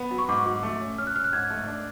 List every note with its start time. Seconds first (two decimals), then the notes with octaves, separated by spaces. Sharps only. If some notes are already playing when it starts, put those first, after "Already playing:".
Already playing: B3 F#5
0.11 F#3
0.18 C#6
0.29 G#2 D6
0.46 F#3
0.63 A3
0.81 C#4
0.98 C#4 F6
1.07 F#6
1.15 C#4 F6
1.24 F#6
1.33 G#2 G#6
1.50 A3
1.68 D4